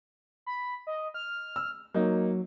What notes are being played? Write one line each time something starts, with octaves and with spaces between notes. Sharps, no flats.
B5
D#5
F6
E6
F#3 A#3 D#4